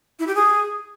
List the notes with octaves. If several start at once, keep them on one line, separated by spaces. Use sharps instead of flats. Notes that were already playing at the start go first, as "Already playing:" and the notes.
E4
G4
G#4